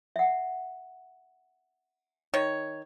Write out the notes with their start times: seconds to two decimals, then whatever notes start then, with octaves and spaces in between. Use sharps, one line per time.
0.16 E5 F#5
2.34 D#3 C#5